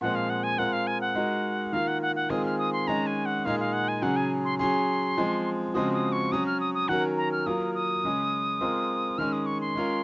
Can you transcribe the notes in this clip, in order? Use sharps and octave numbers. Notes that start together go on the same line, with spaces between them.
A#2 F3 G#3 C4 F#5
F5
F#5
G#5
G#3 C4 F4 A#4 F#5
F5
G#5
F#5
G#3 D#4 F#4 A#4
D#3 A#3 F4 F5
F#5
F#5
F#5
D#3 G#3 C4 F4 G#4 D#6
F6
D#6
C6
D#3 G#3 C#4 A#5
G#5
F#5
A#2 G#3 D#4 G#4 F5
F5
F#5
G#5
C#3 F#3 C#4 G#4 F#5
G#5
C6
F#3 C#4 G#4 C6
F3 G#3 C4
C#3 F3 G#3 C4 F#4 D#6
D#6
C#6
F#3 C#4 F#4 D#6
F6
D#6
D#6
D#3 F#3 C#4 F#4 A#4 F#5
A#5
F6
F#3 A#3 F4 A#4 D#6
D#6
C#3 G#3 C#4
G#3 C4 F4 A#4
D#3 G#3 C#4 F6
D#6
C#6
C6
G#3 C#4 F4 A#4